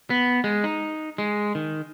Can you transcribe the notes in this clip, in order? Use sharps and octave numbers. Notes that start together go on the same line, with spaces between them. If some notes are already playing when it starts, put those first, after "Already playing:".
B3
G#3
D#4
G#3
D#3